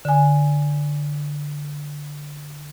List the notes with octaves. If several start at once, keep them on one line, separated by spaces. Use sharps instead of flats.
D3 G#5